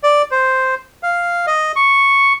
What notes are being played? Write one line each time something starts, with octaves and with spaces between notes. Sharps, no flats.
D5
C5
F5
D#5
C#6